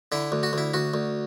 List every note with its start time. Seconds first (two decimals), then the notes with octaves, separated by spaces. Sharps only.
0.12 D3 E4
0.32 D2
0.43 F#4
0.53 D2 E4
0.74 D2 F#4
0.94 D2